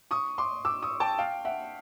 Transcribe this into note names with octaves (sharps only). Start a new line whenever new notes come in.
C#6 D#6
C6 D6
D6 E6
C#6 D#6
G5 A5
F5 G5
E5 F#5